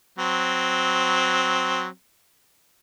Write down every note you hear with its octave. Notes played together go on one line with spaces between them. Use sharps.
F#3 C4